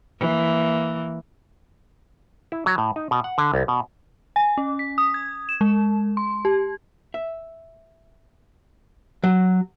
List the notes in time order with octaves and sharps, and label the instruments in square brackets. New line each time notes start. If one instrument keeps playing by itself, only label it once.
[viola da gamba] E3 A#3
[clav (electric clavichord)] E4
F#3
A2
D#4
B2
F#5
D3
C2
B2
[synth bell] G#5
C#4
B6
D#6
G#6
E7
G#3
C6
G4
[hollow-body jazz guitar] E5
F#3